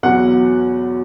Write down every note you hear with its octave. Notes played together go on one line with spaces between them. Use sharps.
E2 B2 F#3 F#5